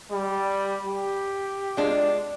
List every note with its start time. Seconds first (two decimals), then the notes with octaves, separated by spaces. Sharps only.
0.12 G3
0.86 G4
1.77 G#3 D4 F4